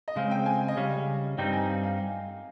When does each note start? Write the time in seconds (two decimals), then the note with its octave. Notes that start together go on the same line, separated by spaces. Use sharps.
0.08 D#5
0.16 C#3 G#3 C4 F5
0.31 G5
0.46 G#5
0.68 D#5
0.77 C#3 G3 C#4 F5
1.38 G2 G3 C4 D#4 G5
1.53 G#5
1.68 F5
1.83 F5